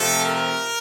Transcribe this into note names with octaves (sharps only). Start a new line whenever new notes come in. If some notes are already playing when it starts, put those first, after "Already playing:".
Already playing: C3 F3 A3 A4
A#4